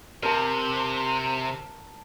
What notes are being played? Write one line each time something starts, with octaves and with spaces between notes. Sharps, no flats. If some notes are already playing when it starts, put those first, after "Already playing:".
C3 A#4 A5